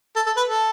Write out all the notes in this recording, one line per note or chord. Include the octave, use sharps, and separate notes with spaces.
A4
A4
B4
A4